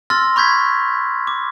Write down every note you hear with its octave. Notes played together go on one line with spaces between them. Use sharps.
C6 E6 F6 A6 A#6
B5 C#6 G6 G#6 B6
D6